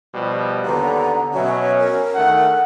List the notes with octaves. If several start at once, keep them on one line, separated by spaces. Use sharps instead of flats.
B2 F3 G3
D#2 D3 B3 A#5
B2 F#3 C#4 E5
A#4
D2 D#3 A3 F#5